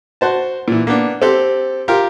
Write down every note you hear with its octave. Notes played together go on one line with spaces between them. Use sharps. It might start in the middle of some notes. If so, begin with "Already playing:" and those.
F#4 C5 A5
A#2 E3
A#3 B3 D4
C4 G4 A4
F4 G4 A#4